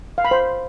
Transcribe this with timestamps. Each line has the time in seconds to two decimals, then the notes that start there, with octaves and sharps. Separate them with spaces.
0.18 F5
0.25 B5
0.31 C5